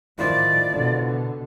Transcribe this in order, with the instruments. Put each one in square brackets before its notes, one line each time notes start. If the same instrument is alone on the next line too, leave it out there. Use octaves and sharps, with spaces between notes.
[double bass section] A2 D#3 F3 [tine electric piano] E4 F4 C5 [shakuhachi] D5
[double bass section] B2 D3